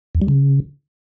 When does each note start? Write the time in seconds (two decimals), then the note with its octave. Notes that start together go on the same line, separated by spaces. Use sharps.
0.15 E2
0.22 G3
0.28 C#3